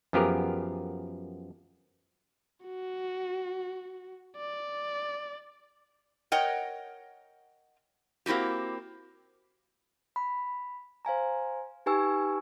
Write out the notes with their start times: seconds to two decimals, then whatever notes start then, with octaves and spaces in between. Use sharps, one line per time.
0.13 F#2 F3 B3 G4 G#4 A#4
2.64 F#4
4.37 D5
6.32 A#4 C#5 D#5 F#5 G5
8.26 A#3 C4 E4 F#4 G4
10.16 B5
11.05 C5 F5 G#5 A#5
11.86 D#4 G4 B4 G#5 C#6 E6